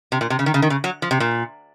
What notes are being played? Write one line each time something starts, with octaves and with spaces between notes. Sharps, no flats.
C3
A#2
C3
C#3
D#3
C#3
D#3
C#3
F#3
F3
C3
A#2